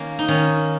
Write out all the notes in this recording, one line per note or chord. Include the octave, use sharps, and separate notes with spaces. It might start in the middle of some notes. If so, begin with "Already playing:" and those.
Already playing: D#3 A#3 C#4
D#4
D#3 C#4